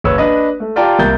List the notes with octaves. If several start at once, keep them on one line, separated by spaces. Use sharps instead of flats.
F#1 B4 C#5 E6
D4 B4 D#5
A3
F4 G4 D5 G5 A5 A#5
C2 A#3 G6 A6